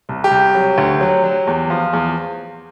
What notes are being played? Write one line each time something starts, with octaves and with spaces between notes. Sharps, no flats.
C2
G4
C2
F#3
D2
F#3
F#3
E2
F3
E2